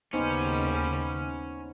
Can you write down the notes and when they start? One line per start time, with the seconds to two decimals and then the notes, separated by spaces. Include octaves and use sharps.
0.13 D#2 C#3 G3 B3 C#4 D#4 C5